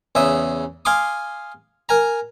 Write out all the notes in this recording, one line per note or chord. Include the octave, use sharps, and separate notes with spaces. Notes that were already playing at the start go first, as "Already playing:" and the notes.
E2 C#3 E5 D#6
F5 G#5 C6 D6 D#6
A#4 G#5 A#5